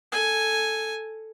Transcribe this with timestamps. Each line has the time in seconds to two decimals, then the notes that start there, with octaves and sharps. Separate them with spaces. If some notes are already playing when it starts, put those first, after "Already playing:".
0.12 A4 G#5